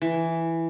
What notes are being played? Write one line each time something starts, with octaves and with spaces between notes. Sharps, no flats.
E3